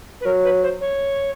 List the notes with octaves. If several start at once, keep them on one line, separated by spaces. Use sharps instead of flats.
B4
F#3 A#4
B4
C5
C#5